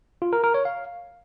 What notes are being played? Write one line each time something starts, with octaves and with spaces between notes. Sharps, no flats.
F4
A#4
A#4
C#5
F5